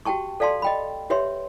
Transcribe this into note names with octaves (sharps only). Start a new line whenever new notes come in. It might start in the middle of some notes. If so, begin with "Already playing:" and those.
F#4 G4 G5 A5 C#6
A4 D5 F5 A5 C6
D#5 G5 B5
G4 B4 C#5 E5 C6